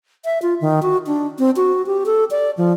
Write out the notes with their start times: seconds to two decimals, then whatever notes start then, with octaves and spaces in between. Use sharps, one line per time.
0.25 E5
0.42 F4
0.61 D#3
0.82 F#4
1.07 D4
1.39 C4
1.56 F#4
1.86 G4
2.06 A4
2.31 D5
2.57 F3